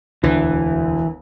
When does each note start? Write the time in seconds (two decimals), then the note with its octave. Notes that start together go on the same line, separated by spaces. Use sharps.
0.23 E1 D2 D3 E3